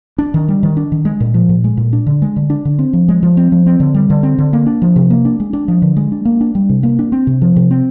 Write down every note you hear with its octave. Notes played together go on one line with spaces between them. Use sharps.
D4
D#3
G3
D#3
D4
D#3
G#3
A#2
F3
A#2
G#3
A#2
D4
D3
G#3
D3
D4
D3
C4
F3
G#3
F3
C4
F3
C4
D3
G3
D3
C4
D3
A#3
D4
F3
C3
A#3
D4
G#3
D4
F3
D3
G#3
D4
A#3
D4
G3
C3
A#3
D4
C4
C3
F3
C3
C4